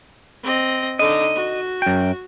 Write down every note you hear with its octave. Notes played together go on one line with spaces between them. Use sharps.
C4 D#5
D3 D#4 D#5
F#4
F#2 G5